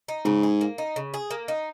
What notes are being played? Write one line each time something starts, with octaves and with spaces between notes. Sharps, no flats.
D#4
G#2 C#3
G#4
A#3
D#4
C#3
G#4
A#3
D#4